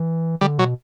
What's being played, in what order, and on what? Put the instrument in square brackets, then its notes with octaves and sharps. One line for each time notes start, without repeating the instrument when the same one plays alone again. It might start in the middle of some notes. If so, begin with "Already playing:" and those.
Already playing: [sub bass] E3
[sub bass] D3 [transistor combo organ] G3
[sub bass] B2 [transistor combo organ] F#3